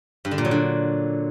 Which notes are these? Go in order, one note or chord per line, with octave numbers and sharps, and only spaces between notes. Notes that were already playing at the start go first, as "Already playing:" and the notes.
G2
D3
A#2
F#3
D3